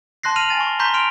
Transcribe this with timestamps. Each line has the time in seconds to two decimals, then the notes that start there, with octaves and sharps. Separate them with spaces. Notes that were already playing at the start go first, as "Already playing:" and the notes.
0.23 A5 C6 F#6 A#6 C7
0.36 F6 D#7 F7 F#7
0.49 G#5 A6 D#7
0.61 C#6
0.79 A#5 C6 C#6 G6 B6
0.94 C6 F6 D7 F7